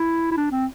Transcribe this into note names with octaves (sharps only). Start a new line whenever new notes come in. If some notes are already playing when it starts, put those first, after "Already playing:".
Already playing: E4
E4
D4
C4